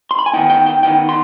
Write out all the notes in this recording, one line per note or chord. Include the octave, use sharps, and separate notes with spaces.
C6
B5
G#5
D#3 B3 D#4 G5
G5
G5
D#3 B3 D#4 G5
C6